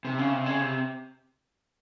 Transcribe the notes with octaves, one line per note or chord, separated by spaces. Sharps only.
C3
C#3
C3
C#3
C3